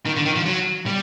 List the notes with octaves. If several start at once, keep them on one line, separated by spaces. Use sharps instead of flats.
D#3
D3
D#3
F3
F#3
G3